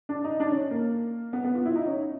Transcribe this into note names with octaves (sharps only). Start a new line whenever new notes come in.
D4
D#4
D4
C#4
A#3
B3
B3
F4
E4
D#4
C#4